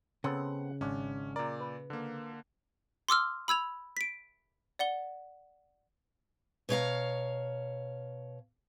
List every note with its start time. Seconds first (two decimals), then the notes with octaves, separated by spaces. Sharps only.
0.24 C#3 B3 C4 A4 F#5
0.81 G#1 C#4 D4
1.36 A#2 A#4 D5
1.61 B4
1.90 D3 A#3
3.09 C6 D6 E6 F6
3.48 B5 E6 G#6 F7
3.97 B6 D7
4.79 D5 F#5 G7
6.69 B2 C#5 F5 A#5